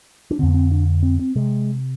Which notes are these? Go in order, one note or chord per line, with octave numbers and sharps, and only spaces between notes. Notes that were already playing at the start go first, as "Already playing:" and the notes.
D4
F2 D3 C4
B3
C4
D4
C4
C4
C3 G#3